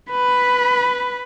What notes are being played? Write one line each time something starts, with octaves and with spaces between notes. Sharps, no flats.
B4 B5